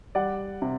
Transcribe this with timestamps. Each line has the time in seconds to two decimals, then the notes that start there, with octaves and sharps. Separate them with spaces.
0.15 G3 D5 F#5
0.62 C3